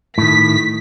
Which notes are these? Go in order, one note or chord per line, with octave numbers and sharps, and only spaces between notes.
A2 D#3 B6